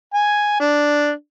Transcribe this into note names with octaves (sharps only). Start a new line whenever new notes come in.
G#5
D4